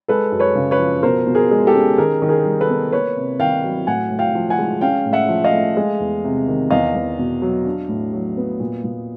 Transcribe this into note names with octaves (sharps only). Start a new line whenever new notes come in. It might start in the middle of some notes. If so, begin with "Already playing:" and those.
G#3 A4 B4
F#2
B4 C#5
C#3
B4 C#5
F3
B2 A#4 C5
B2
G#4 A#4
G#3
G4 A4
C#4
D#3 G#4 A#4
D#3
G#4 A#4
G3
A4 B4
B3
A#3 B4 C#5
C3
D#3 F5 G5
F#3
A2 F#5 G#5
A2
F5 G5
F3
F#5 G#5
G#3
C#4 F5 G5
A2
E5 F#5
F3
D#5 F5
A3
G#3
E2
C3
D#3
E2 D#5 F5
E2
B2
F#3
D4
A2
F#3
B3
A#2
A#2